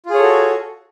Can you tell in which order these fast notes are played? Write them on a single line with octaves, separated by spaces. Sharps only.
F4 G#4 C#5 A4 F#4